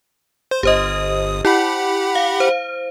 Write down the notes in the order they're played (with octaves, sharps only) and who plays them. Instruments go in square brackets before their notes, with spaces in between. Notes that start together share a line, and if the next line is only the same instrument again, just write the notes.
[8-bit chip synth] C5
[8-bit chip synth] G1 D#6 [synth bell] G4 C5 D#5
[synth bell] E4 [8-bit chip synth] G4 F#5 B5
[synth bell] F5
C5